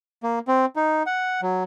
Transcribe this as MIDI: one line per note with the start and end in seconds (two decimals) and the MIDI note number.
0.23 0.39 58
0.48 0.65 60
0.76 1.03 63
1.06 1.41 78
1.42 1.64 54